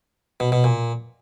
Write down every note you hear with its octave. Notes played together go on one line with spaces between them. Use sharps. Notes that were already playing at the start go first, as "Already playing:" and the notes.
B2
B2
A#2